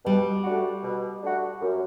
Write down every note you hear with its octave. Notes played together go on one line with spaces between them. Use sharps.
B2 G3
A3 D4 F#4
B2
A3 D4 F#4
F#2